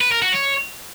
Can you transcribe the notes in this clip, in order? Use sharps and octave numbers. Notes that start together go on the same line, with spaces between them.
B4
A#4
F#4
C#5